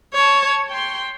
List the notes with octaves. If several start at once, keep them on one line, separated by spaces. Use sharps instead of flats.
C#5 A5
G5 C6